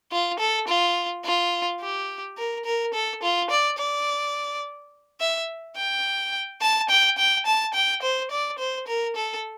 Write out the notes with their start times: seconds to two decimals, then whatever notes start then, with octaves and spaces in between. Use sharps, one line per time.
0.12 F4
0.39 A4
0.68 F4
1.25 F4
1.81 G4
2.38 A#4
2.65 A#4
2.94 A4
3.23 F4
3.50 D5
3.78 D5
5.20 E5
5.76 G5
6.62 A5
6.89 G5
7.18 G5
7.46 A5
7.74 G5
8.02 C5
8.31 D5
8.59 C5
8.87 A#4
9.16 A4